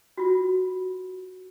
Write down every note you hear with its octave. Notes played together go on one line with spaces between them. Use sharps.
F4 F#4